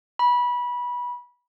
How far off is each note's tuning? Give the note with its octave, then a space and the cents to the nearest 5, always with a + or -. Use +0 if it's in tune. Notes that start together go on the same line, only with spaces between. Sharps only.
B5 -20